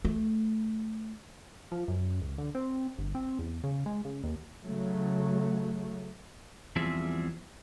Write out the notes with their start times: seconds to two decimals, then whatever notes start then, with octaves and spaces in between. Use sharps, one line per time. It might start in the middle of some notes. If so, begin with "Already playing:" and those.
0.05 A3
1.72 F3
1.88 F#2
2.22 C#2
2.38 D3
2.55 C4
2.98 G1
3.15 C4
3.39 E2
3.64 C#3
3.86 G#3
4.05 C#3
4.23 D#2
4.64 C#3 F#3 A3
6.76 E2 F3 G3 C4 G#4 E5